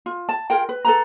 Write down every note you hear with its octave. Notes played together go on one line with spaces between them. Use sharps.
F4
A5
F4 G#4 A#4 G5
B4
A4 B4 A#5